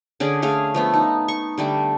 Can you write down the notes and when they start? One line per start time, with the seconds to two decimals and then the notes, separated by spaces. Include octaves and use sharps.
0.20 D3 C#4 G#4 D5
0.42 A3 G#4 F5
0.74 F3 A3 B3
0.94 D#4
1.28 C#6
1.58 D3 G3 A3